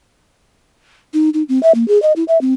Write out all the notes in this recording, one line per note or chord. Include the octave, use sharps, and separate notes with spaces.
D#4
D#4
C4
E5
A#3
G#4
D#5
E4
E5
C4